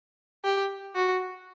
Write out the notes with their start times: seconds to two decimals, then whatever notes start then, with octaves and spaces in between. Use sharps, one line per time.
0.44 G4
0.96 F#4